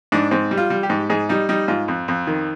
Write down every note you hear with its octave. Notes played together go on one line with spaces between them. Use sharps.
G#2 D4
G#2 C4
G3
F4
G3
G4
G#2
G#2 G#4
G3 D#4
G3 D#4
G#2 F4
F2
F2
D#3